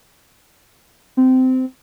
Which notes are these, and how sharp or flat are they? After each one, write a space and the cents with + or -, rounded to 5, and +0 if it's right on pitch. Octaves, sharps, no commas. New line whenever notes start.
C4 -20